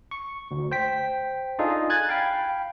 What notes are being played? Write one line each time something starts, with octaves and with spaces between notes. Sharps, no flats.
C#6
D2
C5 G5 B6
D4 D#4 F4 G#4 A4
G#5 F#6 G#6 A6
F5 G5 B5